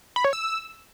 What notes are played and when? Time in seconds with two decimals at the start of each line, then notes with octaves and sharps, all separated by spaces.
0.16 B5
0.25 C#5
0.33 E6